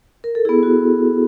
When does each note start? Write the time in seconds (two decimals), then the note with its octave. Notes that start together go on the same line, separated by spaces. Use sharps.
0.24 A#4
0.35 A4
0.45 B3 E4 G#4
0.63 F#4